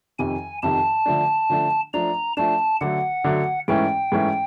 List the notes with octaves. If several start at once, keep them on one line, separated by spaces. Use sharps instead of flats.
F2 C3 D#3 G#5
F2 C3 D#3 A5
D3 F3 A3 D4
D3 F3 A3 D4
F3 A3 D4 A#5
F3 A3 D4 A5
D3 F#3 A3 F#5
D3 F#3 A3
G#2 E3 A3 C#4 G5
G#2 E3 A3 C#4